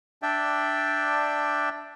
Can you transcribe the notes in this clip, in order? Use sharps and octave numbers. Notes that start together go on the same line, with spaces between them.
D4 D5 E5 G5